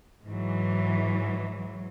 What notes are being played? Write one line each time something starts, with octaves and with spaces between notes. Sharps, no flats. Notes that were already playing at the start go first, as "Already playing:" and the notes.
G#2 E3 F#3